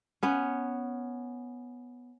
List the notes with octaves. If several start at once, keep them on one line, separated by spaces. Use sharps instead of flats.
B3 C#4